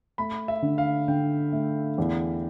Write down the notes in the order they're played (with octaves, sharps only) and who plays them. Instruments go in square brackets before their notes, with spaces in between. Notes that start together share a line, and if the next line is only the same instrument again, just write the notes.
[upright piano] A3 [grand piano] B5
[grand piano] E5
[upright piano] D3
[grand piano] F5
[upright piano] D3 [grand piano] G5
[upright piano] A3
E2